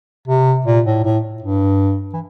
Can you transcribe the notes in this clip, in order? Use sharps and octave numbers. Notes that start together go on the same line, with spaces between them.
C3
A#2
A2
A2
G2
E3